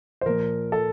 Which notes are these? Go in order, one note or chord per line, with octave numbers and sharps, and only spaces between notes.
C5
A#2 F3 A#4
A4